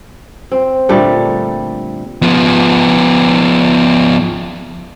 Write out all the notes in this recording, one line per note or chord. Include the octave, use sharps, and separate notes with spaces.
C4
A#2 D3 G3 A3
F3 B3